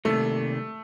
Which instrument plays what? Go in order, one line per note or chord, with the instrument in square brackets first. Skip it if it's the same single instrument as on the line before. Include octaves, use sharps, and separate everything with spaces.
[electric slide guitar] C3 D#3 G3 A#3 [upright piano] A3